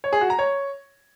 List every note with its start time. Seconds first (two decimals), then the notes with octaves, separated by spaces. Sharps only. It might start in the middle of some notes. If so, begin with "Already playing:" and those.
0.04 C#5
0.13 G#4
0.21 F#4
0.30 A#5
0.39 C#5